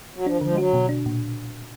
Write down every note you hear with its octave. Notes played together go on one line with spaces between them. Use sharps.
F#3
F3 D4
D#3
D3 F3
G#3
F#3 F#4
B2
D4
A#2